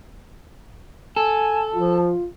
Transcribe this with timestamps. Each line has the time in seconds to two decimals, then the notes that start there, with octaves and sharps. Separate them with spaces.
1.16 A4 G#5
1.74 F3 F4